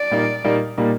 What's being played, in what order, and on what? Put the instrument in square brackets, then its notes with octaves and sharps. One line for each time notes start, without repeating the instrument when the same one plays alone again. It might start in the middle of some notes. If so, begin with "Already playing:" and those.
Already playing: [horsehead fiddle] D5
[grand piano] A#2 G3 A#3 D#4
A#2 G3 A#3 D#4
A#2 G3 A#3 D#4